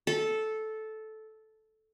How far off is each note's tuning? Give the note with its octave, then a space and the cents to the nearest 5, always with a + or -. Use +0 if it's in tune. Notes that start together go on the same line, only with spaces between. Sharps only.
A4 -10